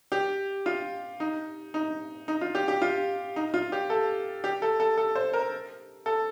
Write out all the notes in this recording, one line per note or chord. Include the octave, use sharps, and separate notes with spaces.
G4
F4
D#4
D#4
D#4
F4
G4
G4
F4
D#4
F4
G4
A4
G4
A4
A4
A4
C5
A#4
A4